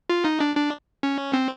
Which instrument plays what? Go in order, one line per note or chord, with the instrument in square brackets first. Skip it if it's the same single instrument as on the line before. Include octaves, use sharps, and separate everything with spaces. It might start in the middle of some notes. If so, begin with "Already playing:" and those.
[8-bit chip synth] F4
D#4
D4
D4
C#4
C4